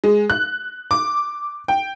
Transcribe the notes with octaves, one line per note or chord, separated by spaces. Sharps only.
G#3
F#6
D6
G5